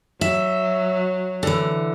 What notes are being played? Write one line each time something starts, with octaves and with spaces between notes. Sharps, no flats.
F#3 E5
D3 E3